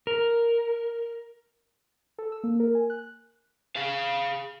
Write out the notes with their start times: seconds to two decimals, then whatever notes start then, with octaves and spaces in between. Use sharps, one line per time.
0.07 A#4
2.18 A4
2.32 E6
2.44 A#3
2.60 A#4
2.75 G#5
2.90 F#6
3.76 G#4 F5